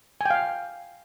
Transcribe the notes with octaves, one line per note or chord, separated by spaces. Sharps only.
F5 G5 G#5